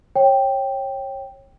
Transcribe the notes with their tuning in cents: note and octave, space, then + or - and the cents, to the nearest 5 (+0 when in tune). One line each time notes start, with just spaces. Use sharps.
C#5 -25 G5 +0